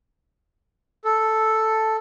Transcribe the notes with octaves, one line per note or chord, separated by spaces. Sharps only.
A4